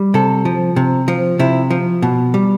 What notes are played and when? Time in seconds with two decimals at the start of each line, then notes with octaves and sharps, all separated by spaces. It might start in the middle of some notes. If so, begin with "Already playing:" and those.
Already playing: G3
0.14 C3 A4
0.45 F3
0.76 C3
1.08 F3
1.39 C3 E4
1.70 F3
2.02 B2
2.34 G3